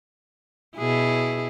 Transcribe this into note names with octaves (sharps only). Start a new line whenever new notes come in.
B2 E4 G#4